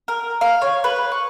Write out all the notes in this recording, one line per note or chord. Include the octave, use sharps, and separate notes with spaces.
A#4
F5
C#5
B4
C#6